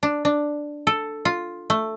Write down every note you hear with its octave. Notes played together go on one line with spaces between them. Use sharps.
D4
D4
A4
F4
A3